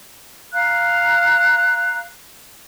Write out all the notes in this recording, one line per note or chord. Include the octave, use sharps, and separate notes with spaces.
F5 A#5 F#6